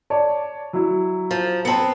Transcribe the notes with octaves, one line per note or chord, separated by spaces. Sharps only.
C#5 D5 A5
F#3 E4
F3
B3 C4 A5 C#7